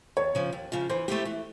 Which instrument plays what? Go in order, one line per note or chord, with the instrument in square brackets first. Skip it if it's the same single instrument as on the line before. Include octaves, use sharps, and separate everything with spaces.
[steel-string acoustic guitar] D#2 [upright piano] C#5
[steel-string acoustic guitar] C#3 F3
D#2
C#3 F3
[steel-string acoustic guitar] E3 [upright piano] C5
[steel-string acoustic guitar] A3 C4 E4 G4
E3